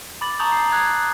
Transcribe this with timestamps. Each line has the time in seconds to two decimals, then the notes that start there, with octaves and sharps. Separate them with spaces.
0.21 B5 D6 A6 F#7
0.39 A5 A#5 C#6 D#6 G6 F#7
0.52 C7
0.72 D#6 F#6 G#6